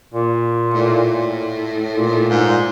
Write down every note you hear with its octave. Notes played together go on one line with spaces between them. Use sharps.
A#2
A2
A#2
G#2